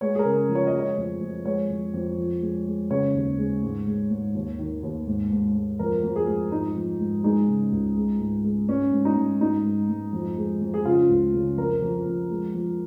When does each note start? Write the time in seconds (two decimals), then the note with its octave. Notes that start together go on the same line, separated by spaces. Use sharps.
0.01 G#3 C#5
0.15 G#4
0.19 A#4
0.25 C#3
0.49 F3
0.55 C#5
0.67 D#5
0.74 G#3
0.79 C#5
0.97 F2
1.21 F2
1.45 G#3 C#5
1.69 F2
1.94 F2
2.18 F3
2.42 G#3
2.66 G#3
2.90 C#3 C#5
3.14 D#2
3.38 G#3
3.63 G#2
3.87 G#3
4.11 G#2
4.35 D#2
4.59 D#3
4.83 D#2
5.07 G#2
5.32 G#2
5.55 G#3
5.79 F2 A#4
6.04 F2
6.16 G#4
6.28 G#3
6.52 G#2 D#4
6.76 F3
7.00 G#2
7.24 G#3 D#4
7.48 C#3
7.72 C#2
7.96 G#3
8.20 G#2
8.44 G#3
8.69 G#2 C#4
8.92 G#2
9.05 D#4
9.17 G#2
9.41 G#2 D#4
9.65 G#2
9.89 G#2
10.13 F2
10.37 G#3
10.61 F2
10.74 G#4
10.85 C#3 F4
11.10 C#2
11.34 C#3
11.57 F2 A#4
11.82 F2
12.06 F2
12.30 G#3
12.54 F3